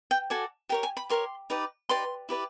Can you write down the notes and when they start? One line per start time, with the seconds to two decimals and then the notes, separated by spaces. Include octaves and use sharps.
0.11 G5
0.30 F#4 A4 D5 G#5
0.69 G4 A#4 C#5 G5
0.83 G#5
0.97 B5
1.09 G4 A#4 C#5 C6
1.50 D#4 G4 B4 D5
1.89 D#4 G4 B4 D5 C6
2.29 E4 G4 B4 D5